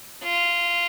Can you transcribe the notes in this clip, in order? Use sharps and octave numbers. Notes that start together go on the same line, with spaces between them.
F4